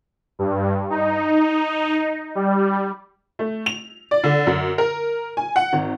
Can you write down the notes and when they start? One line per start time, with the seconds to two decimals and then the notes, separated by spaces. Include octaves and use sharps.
0.39 G2
0.90 D#4
2.35 G3
3.39 A3
3.66 F7
4.11 D5
4.24 D3
4.47 F#2
4.78 A#4
5.37 G#5
5.56 F#5
5.73 G#1